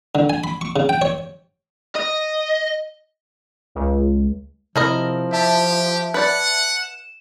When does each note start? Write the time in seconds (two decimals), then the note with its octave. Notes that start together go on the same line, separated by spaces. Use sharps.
0.15 D3
0.30 G#5
0.44 B5
0.61 C#6
0.76 C#3
0.89 G5
1.02 C#5
1.95 D#5
3.75 C#2
4.76 C3 F3 E4 A#4 D#5
5.33 G4 E5 A5
6.14 B4 D5 F#5
6.83 E7